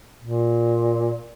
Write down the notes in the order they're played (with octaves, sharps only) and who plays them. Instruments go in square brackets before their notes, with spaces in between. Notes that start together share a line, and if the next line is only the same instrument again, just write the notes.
[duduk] A#2